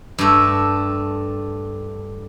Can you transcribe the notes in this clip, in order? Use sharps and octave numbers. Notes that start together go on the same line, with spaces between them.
G2 A3